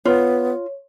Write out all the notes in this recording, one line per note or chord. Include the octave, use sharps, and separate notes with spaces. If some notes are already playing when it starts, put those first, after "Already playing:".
B3 F4 C#5